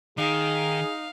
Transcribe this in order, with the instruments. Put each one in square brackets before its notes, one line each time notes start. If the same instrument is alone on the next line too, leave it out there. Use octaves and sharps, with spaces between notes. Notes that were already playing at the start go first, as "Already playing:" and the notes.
[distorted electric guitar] D#3 [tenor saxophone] D#4 [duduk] G#4 [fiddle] F5